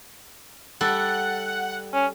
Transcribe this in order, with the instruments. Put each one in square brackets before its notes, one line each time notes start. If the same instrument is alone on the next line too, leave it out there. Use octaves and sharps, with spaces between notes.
[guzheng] G3 A4 [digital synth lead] F#5
[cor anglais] C#4